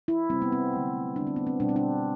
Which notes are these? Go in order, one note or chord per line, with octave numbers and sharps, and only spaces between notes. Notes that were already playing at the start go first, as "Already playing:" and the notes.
E4
C3 G3 C4
B3
C4
D3 F#3 A3
D3 G3 D4
C4
B3
C4
B2 G3 D4
C4
D4